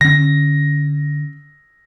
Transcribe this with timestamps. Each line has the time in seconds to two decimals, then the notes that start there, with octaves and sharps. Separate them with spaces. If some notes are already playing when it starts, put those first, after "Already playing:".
0.01 D3 C#4 A#6